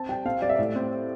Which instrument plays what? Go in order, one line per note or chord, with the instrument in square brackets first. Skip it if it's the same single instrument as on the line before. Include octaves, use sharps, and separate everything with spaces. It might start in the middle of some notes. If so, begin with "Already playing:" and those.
Already playing: [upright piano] C4 A5
G3 G5
C4 F5
G3 D5
E5
A2 D5
C4